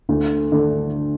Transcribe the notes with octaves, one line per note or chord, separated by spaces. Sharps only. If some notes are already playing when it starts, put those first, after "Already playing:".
D2
D3 A3